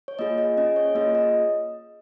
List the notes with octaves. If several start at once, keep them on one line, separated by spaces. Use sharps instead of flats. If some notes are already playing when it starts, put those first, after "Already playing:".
C#5
A#3 F4 G#4 D#5
D#5
C#4 G#4 D#5
C#5
A#3 F4 G#4 D#5
D#5